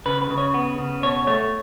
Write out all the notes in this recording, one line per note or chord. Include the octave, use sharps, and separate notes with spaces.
C#3 B4
B4
C#3
C#5
B3
C#3
B2 C#5
A3 C#5